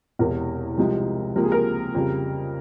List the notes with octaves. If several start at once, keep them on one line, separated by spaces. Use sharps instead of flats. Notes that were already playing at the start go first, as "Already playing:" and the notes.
E1 E2 C3 E3 A#4
C2 C3 F3 G#3
C#2 C3 F3 A#3 A#4
G#4
A#4
F2 C#3 G3